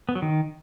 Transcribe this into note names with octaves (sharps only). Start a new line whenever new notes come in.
B3
F#3
D#3